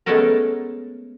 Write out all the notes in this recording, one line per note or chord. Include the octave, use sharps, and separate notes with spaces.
G#3 A3 B3 C#4 A4 A#4